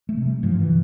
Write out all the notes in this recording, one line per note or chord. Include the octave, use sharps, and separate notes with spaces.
A3
C3
G3
G2 F3
E3
D3